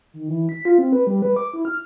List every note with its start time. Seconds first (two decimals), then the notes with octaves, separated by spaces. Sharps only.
0.13 D#3
0.29 E3
0.49 B6
0.65 F4
0.78 C4
0.92 B4
1.07 G3
1.22 B4
1.36 D6
1.53 E4
1.65 F6